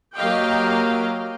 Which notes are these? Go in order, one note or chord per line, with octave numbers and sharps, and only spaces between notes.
F#3 A#3 G4 D#5 F5 G5